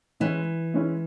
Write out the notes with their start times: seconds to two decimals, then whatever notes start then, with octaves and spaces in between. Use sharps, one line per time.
0.20 E3 G#3 C#4 E4
0.74 G#3 C#4 E4